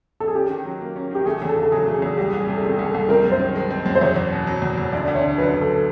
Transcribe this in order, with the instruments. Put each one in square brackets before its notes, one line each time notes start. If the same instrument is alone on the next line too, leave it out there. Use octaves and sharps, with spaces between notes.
[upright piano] A4
G#4
[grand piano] C#4 [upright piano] G4
[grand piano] D#3
F#3
A#3
C#4
[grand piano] D#3 [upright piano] G4
[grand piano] A3 [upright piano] G#4
[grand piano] E2 [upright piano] G#4
[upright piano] A4
[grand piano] C#3
[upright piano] A4
[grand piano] F#3 [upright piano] G#4
[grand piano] A3
[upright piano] G#4
[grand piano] E2
[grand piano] C2 [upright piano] G4
[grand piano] C2
[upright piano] G#4
[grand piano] C3
[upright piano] A4
[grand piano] D#3 [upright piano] G#4
[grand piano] C2 [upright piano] G#4
[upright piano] A4
[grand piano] C2
[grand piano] C4 [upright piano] A#4
[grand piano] F#2
[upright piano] C5
[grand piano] D#3
G#3
C4
F#2
[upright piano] C5
[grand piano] E2 [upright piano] C#5
[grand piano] E2
B2
F#3
E2
E2
[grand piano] D2 [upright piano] D5
[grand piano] D2
[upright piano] C#5
[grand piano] D3
[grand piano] F#3 [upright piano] B4
[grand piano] D2
[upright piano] A4